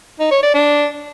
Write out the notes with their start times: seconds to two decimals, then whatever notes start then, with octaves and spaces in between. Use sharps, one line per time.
0.20 D#4
0.31 C#5
0.43 D5
0.54 D4